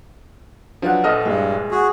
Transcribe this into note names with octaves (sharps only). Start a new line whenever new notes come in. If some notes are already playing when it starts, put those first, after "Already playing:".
F3 F#3 D4 B4 F#5
A#1 A4 C5 D#5 D#6 F6
G2 G#3 A#3 E4
F#4 G#4